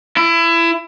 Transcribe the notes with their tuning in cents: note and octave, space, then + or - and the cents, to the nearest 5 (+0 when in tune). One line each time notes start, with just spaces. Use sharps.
E4 +25